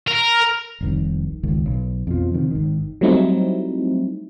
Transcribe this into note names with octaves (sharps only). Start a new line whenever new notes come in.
A#4
F1 C2 D#3
G#1 C#2 D#3
B1
F2 B2 F3
C3 D#3
G#1 D#3
F#3 G3 A3 C4 D#4 E4